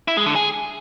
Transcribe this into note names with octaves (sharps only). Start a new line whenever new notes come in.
E4
G#3
D3
G#4